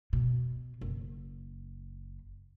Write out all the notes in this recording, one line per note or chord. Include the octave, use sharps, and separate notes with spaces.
B2
F#1